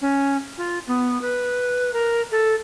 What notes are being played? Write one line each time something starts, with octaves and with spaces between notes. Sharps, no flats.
C#4
F4
B3
B4
A#4
A4